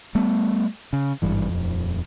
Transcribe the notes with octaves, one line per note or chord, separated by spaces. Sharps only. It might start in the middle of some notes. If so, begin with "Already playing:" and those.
G3 A3 B3
C#3
G#1 G2 E3
D#1 F2